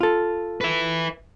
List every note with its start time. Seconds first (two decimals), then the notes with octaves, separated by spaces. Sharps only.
0.01 F4 A4
0.61 B4 E5